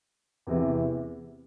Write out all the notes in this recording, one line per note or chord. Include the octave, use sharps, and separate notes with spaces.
E2 C3 E3